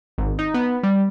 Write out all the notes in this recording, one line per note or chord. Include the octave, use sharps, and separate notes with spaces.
G#1
D#4
B3
G3